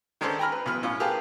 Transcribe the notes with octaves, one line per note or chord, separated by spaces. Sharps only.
D#3 G#3 C#4 D4 A4 C5
G5 G#5 A#5 B5 F6
B4
B1 B2 E3 B4 F6
A2 C#4 F4
G4 G#4 A#4 B4 F5 A5